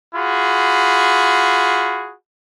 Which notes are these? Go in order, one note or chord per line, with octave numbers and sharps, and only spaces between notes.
F4 F#4 G#4 B5